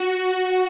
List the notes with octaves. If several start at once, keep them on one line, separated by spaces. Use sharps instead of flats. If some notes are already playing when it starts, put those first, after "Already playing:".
Already playing: F#4